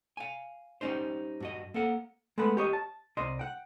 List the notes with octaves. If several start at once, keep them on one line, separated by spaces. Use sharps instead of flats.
F5 G#5
G3 C#4 D#4 C5
G2 F#4 D#5
A#3 A4 F#5
G#3 A3 B3 F#5 B5
G4 C#5 D#5
A5
C2 D5 D#5 C6
F#5 G5